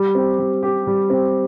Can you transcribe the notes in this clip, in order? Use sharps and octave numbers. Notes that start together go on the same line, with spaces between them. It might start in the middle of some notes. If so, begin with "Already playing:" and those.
Already playing: G3
C4 G4
G3
C4 G4
G3
C4 G4